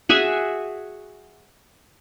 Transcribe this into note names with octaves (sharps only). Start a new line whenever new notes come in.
F#4 G#4 E5 G#5